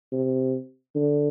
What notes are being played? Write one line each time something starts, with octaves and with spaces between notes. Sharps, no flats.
C3
D3